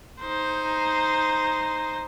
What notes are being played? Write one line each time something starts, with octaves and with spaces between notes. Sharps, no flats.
D#4 C5